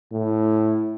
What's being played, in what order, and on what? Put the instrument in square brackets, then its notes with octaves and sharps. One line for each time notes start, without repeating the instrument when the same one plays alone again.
[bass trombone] A2